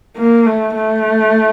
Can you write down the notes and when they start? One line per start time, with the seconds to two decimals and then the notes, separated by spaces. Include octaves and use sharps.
0.17 A#3
0.46 A3
0.75 A3